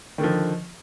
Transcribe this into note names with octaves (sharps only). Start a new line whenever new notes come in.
D3 D#3 F3